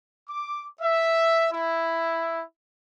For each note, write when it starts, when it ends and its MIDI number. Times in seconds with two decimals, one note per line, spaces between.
0.29 0.66 86
0.81 1.47 76
1.52 2.43 64